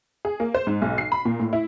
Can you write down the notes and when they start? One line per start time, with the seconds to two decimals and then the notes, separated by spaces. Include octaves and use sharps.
0.25 G#4
0.40 A#3
0.54 C5
0.67 G#2
0.82 B1
0.98 C7
1.12 B5
1.25 A#2
1.40 A2
1.53 E4